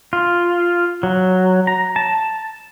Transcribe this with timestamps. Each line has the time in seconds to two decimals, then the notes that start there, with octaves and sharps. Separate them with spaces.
0.13 F4
1.03 F#3
1.67 A#5
1.96 A5